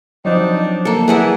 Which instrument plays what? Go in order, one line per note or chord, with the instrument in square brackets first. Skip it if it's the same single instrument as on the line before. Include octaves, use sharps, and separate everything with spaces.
[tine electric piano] F3 F#3 [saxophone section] C4 D4 D#4
[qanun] A#3 A4
[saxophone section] E2 E3 [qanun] G#4 D5 F#5